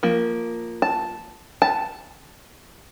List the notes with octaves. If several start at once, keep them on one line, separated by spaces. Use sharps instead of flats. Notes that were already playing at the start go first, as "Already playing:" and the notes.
F3 A#3
A5
A5